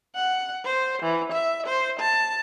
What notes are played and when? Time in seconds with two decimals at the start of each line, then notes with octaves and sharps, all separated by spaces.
0.15 F#5
0.65 C5
1.03 E3
1.33 E5
1.67 C5
2.00 A5